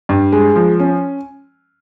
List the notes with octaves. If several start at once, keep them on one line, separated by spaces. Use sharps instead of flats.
G2
G#3
F3
C#4